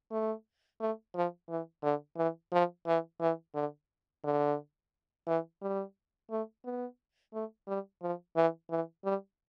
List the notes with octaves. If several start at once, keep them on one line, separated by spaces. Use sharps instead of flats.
A3
A3
F3
E3
D3
E3
F3
E3
E3
D3
D3
E3
G3
A3
B3
A3
G3
F3
E3
E3
G3